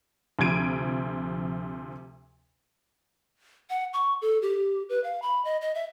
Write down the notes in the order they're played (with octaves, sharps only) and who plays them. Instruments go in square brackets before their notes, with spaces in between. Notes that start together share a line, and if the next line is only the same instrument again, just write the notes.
[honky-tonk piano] D2 C3 F3 G#6 D7 D#7
[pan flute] F#5
C#6
A4
G4
B4
F5
B5
D#5
D#5
E5